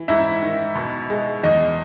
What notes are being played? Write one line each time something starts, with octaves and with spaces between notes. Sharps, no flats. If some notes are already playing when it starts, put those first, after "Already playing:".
Already playing: E3
G#2 E4 E5
D#3
B2
G#3
E2 D#4 D#5